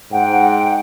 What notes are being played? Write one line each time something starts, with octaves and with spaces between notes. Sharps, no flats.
G#2 F#5 G5